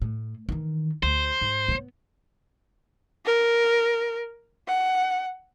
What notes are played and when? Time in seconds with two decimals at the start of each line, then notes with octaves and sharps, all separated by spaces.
0.02 A2
0.49 D#3 E3
1.03 D2 C5
1.41 G#2
1.68 G2 B3
3.26 A#4
4.68 F#5